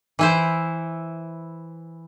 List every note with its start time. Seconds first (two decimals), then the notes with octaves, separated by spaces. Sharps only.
0.19 E3 E4 C5